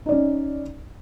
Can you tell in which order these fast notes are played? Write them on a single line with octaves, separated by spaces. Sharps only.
D#4 D5 C#4